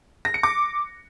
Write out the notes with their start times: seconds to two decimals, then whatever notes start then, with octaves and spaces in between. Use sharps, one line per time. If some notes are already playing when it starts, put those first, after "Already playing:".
0.25 A#6
0.34 C#7
0.43 D6